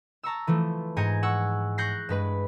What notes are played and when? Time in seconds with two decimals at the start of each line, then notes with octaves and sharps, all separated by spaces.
0.23 A5 A#5 C#6 E6
0.47 E3 F3 A3
0.97 G#2 G#5 A#5 G6 A#6 C#7
1.23 F#5 C#6 E6
1.78 C#6 F#6 G6 A#6 C7
2.09 G2 G#3 B4 B5